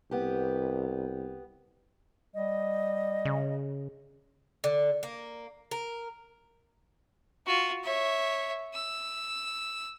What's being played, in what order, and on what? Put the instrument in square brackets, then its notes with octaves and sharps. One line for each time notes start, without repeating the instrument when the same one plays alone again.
[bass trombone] C2 [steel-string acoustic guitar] B3 G4
[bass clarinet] G3 [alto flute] D#5
[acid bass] C#3
[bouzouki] D3
A#3
A#4
[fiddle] F4 F#4
C#5 E5
E6